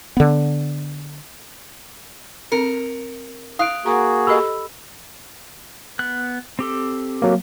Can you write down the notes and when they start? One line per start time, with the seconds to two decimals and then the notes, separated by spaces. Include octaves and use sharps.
0.17 D3 B3
2.52 C4 A#4 C#7
3.59 E4 F5 D#6 F#6 D7
3.86 A#3 F#4 G#4 F#5 A#5
4.27 G4 A4 D#5 B5 E6
5.99 B3 F#6
6.59 C4 G4 A4
7.22 F#3 A#3